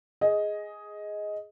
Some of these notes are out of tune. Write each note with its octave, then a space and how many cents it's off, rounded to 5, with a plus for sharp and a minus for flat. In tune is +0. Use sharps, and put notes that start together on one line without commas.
G#4 +0 D#5 +10